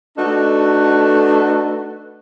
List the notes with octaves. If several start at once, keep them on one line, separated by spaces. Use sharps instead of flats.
A3 D4 D#4 F#4 A4 B4